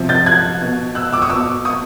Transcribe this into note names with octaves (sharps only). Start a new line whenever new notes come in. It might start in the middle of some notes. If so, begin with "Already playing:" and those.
Already playing: C3 F3
G6 A6
F#6 G#6
B2
E6 F#6
D6 E6
C#6 D#6
B2 D6 E6
C#6 D#6